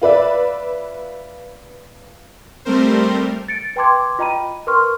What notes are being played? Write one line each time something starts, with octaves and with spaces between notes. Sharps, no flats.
F4 B4 D5 E5
G3 A3 C4 A#4 C5
A6 C#7 D7
B4 G5 A5 C6 D6 G#6
F4 D#5 G5 A#5 B5 D#7
A#4 B4 C6 C#6 F6